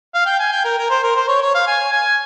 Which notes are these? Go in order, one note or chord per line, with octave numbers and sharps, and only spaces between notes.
F5
G5
G#5
G5
A#4
A#4
C5
A#4
C5
C#5
C#5
F5
G#5
G#5